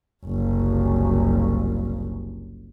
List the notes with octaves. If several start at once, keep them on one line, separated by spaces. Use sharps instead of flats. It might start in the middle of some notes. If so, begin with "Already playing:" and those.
F#1 C2